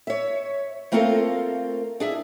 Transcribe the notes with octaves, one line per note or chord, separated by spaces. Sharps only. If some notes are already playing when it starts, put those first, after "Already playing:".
C#5 E5
A3 A#3 C4 F4 A4 A#4
D4 G#4 E5